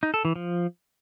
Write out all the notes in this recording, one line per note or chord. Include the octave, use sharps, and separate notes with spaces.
D#4
A4
E3
F3